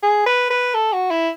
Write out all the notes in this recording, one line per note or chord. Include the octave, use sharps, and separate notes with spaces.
G#4
B4
B4
A4
F#4
E4